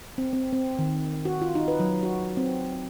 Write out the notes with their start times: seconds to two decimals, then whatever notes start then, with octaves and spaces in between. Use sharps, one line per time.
0.18 C4
0.33 C4
0.53 C4
0.79 D#3
1.25 F#4
1.42 F4
1.55 D#4
1.68 B4
1.80 F#3
2.03 F#4
2.37 C4